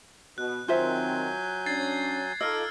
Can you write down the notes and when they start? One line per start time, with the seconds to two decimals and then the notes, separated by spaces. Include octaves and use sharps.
0.38 B2 F#6
0.68 D#3 F#3 C4 F4 C5 E5 G#5 G6
1.66 C#4 D4 G#6 A6 C7
2.41 D#4 F4 A4 D#5 D6 E6 F6